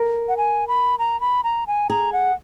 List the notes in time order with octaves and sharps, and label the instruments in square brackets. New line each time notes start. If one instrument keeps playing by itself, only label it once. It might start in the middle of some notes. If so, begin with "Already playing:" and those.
Already playing: [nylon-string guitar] A#4
[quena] F#5
G#5
B5
A#5
B5
A#5
G#5
[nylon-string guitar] G#4 [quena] A#5
[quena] F#5